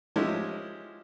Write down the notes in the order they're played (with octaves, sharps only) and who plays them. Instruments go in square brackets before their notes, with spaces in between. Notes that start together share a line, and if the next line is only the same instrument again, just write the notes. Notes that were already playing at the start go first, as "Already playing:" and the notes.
[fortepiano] F3 G#3 C#4 E4 G4